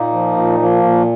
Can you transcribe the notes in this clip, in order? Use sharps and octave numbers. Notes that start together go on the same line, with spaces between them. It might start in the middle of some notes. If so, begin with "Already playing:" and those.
Already playing: A#2 A#3 D#4
F3
A#2
F3 A#3
A#2